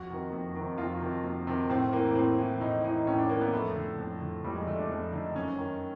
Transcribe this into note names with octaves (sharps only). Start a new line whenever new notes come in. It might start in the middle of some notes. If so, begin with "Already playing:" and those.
Already playing: F2 F#4
C3 D#3
F2
C3 D#3
F2 F4
C3 D#3
F2
C3 D#3
A2 C4
E3 A#3
A2 C4
E3
A2 D#4
E3 D#4
A2 C#4
D4
E3 A#3
B3
F2 A3
D3
F2
D3
F2 G3
G#3
D3 A3
D4
F2 D4
D3 D#4
F#2 C#4
D#3